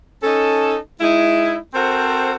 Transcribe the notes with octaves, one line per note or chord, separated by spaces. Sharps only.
C#4 D#4 A4
G#3 D#4 E4
C4 F#4 A4 A#4 C5